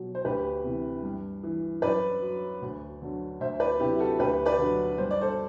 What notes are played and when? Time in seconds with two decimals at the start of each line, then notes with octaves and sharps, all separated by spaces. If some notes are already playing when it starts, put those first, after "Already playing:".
Already playing: B2 F#3
0.15 C5
0.25 D2 G4 B4
0.64 C3 E3
1.03 G2
1.43 E3
1.82 F#2 B4 D5
2.22 F#3
2.62 D2
3.02 D3 F#3
3.40 D2 C5 E5
3.60 B4 D5
3.80 C3 F#3 E4 G4
3.99 F#4 A4
4.19 D2 G4 B4
4.46 B4 D5
4.59 D3 F#3
4.98 G2 C5
5.11 D5
5.21 A4 C5